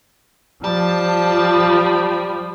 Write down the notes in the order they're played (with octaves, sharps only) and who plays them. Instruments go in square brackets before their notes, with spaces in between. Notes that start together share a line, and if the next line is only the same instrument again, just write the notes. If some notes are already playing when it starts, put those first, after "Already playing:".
[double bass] F3 [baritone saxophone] G3 [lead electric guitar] A5